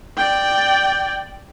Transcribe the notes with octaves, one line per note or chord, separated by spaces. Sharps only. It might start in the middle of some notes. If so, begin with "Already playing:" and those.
D5 G5